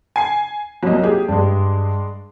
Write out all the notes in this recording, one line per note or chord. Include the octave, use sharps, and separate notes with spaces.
G#5 C7
C2 F#3 A#3 D#5
G4 G#4
G2 G#3 D4